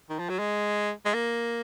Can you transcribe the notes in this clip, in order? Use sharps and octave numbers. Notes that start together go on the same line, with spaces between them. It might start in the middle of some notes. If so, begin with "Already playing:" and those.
D#3
F3
F#3
G#3
G#3
A#3